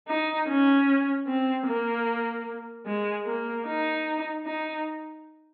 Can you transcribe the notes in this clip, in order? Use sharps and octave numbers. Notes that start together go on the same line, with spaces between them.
D#4
C#4
C4
A#3
G#3
A#3
D#4
D#4